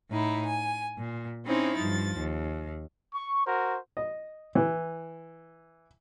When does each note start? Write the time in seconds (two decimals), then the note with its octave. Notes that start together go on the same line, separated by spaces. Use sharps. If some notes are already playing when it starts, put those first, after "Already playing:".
0.12 A2 D#4 E4
0.45 G#5
0.98 A#2
1.46 C4 C#4 D#4 E4 C5
1.76 G2 F3 A6
2.18 D#2
3.13 C#6
3.46 F#4 A#4 C5
3.97 D#5
4.55 E3